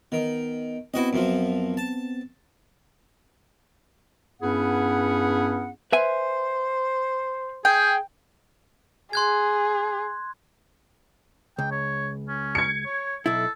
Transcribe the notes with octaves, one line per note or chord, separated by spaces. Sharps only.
D#3 B3
B3 C4 E4 F#4 D#5
F#2 F3
A5
G2 B3 C#4 E4 G#4 F#5
B4 C5 E5 G#5
G#4 G5
G#4 C6 F#6 G#6
C#2 G5
C#5
C#4
G#6 C#7
C#5
B1 E4 A4